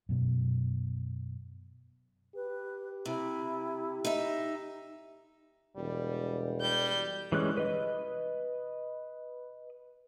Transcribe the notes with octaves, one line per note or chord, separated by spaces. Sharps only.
F#2 B2
G4 B4
C3 E4
D#4 E5
E1 G3
G3 G6
E3 G3 G#3 C#4 F#6
B4 D#5